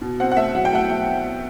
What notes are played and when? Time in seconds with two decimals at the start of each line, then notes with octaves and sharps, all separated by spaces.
0.01 B2
0.20 C4 F#5
0.31 F#5
0.37 A3 E5
0.55 F#3 F#5
0.65 G5
0.73 A3 F#5
0.90 A3